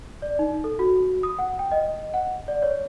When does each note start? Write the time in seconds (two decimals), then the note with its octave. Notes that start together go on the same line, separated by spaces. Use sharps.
0.22 D5
0.39 D#4
0.64 A4
0.79 F#4
1.23 D#6
1.39 F#5
1.59 G5
1.72 D#5
2.14 F#5
2.48 D5
2.62 C#5